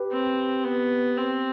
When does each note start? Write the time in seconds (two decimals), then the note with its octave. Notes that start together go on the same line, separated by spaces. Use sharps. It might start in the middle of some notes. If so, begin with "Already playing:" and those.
Already playing: G4 B4
0.11 C4
0.64 B3
1.17 C4